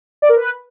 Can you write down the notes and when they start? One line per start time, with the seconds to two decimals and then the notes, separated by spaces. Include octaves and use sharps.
0.22 D5
0.29 A#4
0.36 B4